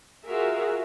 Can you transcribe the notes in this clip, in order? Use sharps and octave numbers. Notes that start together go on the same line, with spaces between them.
F4 F#4 G#4 A#4 E5